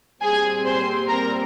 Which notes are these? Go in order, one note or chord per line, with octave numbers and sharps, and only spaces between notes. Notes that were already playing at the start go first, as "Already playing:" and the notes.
A#2 G3 C4 G#4 G#5
C5 C6
A#4 A#5